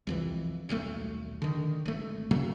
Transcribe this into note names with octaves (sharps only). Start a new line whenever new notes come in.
C2 F2 E3
D#1 B1 A#2 A3
D3 D#3
G#1 A3
A#2 C#3 F#3 A3